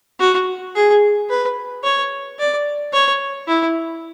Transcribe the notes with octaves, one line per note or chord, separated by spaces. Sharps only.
F#4
G#4
B4
C#5
D5
C#5
E4